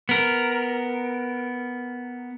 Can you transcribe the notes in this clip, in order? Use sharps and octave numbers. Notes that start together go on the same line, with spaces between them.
B3 A#4